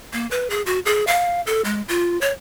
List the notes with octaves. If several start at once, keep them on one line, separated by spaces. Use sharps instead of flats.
A#3
B4
G#4
F#4
G#4
F5
A4
G#3
F4
C#5